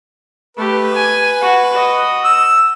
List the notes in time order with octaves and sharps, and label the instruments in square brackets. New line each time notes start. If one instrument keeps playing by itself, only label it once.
[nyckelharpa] A3 G4 [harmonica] B4
[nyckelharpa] G#5
F#4
F#4 D#5
[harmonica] E6